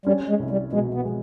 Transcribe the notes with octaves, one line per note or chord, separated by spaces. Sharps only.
G3 C#4
G#3
C2
G3
B2 G#3
B3
G#3